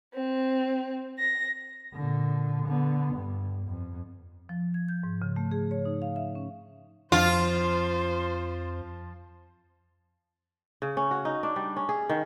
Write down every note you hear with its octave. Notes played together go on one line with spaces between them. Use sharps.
C4
A#6
A#2 D3
D3 B3
G2
F2
F3
G#6
G6
G#2
C#3
A3
G#4
C#5
D#4
F5
E5
C#4
F2 F3 F4 C5
C#3
C#4
F#4
D#4
D4
G3
C#4
G#4
D#3